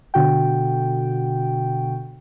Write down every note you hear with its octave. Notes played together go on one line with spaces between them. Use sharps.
B2 D3 F#4 G5